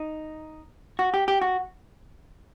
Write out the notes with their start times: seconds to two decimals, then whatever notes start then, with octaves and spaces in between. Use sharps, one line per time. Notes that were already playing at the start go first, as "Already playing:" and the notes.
Already playing: D#4
0.99 F#4
1.14 G4
1.28 G4
1.41 F#4